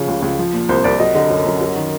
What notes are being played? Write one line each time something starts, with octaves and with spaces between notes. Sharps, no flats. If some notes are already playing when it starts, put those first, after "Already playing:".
Already playing: C#3 F3
C#2
C#2
F3
A#2
C2 C5
C2 D5
F#3 D#5
D3 D#5
F#2
F#2
F#3
D#3